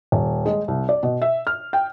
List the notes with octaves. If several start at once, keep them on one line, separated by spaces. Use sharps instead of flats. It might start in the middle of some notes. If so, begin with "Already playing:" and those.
D#1
G#3
C2
D5
B2
E5
F6
G5